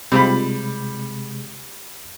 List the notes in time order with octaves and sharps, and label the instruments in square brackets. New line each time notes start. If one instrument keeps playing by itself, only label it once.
[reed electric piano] C3 G#3 [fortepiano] G3 B5 [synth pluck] C4 D#4 F4